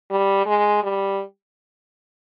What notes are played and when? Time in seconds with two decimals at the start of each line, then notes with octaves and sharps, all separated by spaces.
0.11 G3
0.46 G#3
0.83 G3